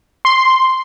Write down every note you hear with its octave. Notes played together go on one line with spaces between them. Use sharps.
C6